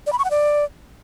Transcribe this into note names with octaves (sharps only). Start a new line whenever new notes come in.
D5
B5
C#6
F#5
D5